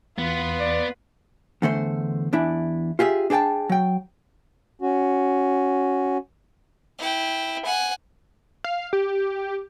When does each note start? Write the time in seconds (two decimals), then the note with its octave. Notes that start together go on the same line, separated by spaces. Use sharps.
0.18 E2 B3 F4 B4
0.60 D5
1.62 E2 D3 A3 C5
2.33 E2 D4 E4
2.99 F4 G4 G#4 E5
3.30 D4 G#4 B4 G5 A5
3.69 F#3 G5
4.82 C#4 F#4
6.99 E4 G5
7.65 F#5 G#5
8.64 F5
8.93 G4